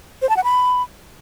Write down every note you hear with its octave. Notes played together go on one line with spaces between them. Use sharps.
C5
A5
F#5
B5